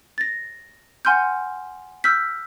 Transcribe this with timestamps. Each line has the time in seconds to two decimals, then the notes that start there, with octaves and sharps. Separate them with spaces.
0.18 A6 A#6
1.05 F#5 G#5 C6 F6 G6
2.04 E6 F6 G6 B6